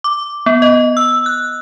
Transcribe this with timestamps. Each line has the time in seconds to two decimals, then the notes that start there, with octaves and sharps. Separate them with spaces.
0.04 D6
0.46 B3
0.62 D#5
0.97 E6
1.26 F#6